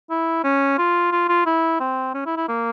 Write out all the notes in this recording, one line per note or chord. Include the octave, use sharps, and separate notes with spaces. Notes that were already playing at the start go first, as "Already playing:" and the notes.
E4
C#4
F4
F4
F4
E4
C4
C#4
E4
E4
A#3